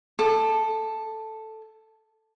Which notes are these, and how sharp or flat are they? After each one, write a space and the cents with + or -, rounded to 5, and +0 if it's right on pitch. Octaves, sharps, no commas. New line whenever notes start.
A4 +0 D6 +35